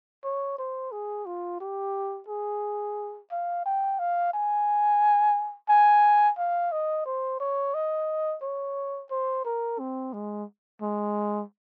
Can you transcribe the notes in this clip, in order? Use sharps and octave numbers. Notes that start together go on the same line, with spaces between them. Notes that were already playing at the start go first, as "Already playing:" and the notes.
C#5
C5
G#4
F4
G4
G#4
F5
G5
F5
G#5
G#5
F5
D#5
C5
C#5
D#5
C#5
C5
A#4
C4
G#3
G#3